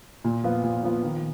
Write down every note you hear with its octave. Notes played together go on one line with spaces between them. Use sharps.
A#2
F3 B3 F4 B4
A#2
F3 B3 F4 B4
D#3